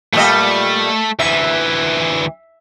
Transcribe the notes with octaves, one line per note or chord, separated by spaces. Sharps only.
A#2 G3 A3 D#5
D2 E3 E5